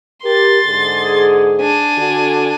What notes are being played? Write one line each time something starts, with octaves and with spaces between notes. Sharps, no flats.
G4 A#4 C6 A6
G#2 D3 G#4
D4 G#5
D3 F#4